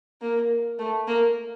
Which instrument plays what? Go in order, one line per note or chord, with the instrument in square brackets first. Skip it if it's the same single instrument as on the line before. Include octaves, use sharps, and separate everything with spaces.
[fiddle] A#3
A3
A#3